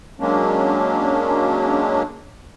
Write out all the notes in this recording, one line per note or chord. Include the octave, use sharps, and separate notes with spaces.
F#3 G#3 A#3 C#4 D4